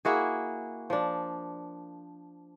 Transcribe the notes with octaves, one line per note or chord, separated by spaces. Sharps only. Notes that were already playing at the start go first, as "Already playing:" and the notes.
A#3 E4 F#4 G#4
F3 D4